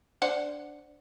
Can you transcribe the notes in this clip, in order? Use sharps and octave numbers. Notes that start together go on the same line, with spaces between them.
D4 C5 F#5